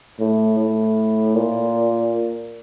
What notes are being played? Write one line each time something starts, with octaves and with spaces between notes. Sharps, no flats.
A2
A2
A#2